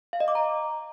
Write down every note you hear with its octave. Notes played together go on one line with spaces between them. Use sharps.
F5
D#5
D6
A#5